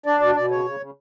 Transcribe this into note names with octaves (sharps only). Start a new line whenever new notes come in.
D4 D5
B2 D5
B2 D5
C#3 C#5
C#3
C#3